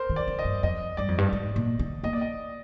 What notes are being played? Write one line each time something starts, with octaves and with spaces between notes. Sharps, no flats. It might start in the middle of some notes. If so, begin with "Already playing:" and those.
Already playing: A#4 C5
D#3
D5
D3
D#5
G2
F2 D#5
G2 D5
F2
G2
G#2
A#2
D3
A#3 D#5
D5
D#5